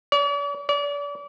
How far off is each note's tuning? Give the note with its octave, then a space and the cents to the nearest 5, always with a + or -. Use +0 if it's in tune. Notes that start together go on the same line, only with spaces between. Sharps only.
D5 -45
D5 -35